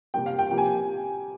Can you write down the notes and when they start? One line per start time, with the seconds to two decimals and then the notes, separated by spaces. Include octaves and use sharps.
0.14 C3 G3 A#3 G5
0.26 F5
0.39 G5
0.51 C3 F3 A#3 G5
0.58 G#5